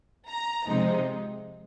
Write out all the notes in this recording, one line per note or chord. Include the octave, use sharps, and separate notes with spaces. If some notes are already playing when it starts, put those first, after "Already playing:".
A#5
C3 F3 G#3 D#4